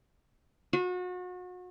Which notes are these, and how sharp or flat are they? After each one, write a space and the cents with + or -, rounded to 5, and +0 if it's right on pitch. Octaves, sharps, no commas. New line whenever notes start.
F#4 -35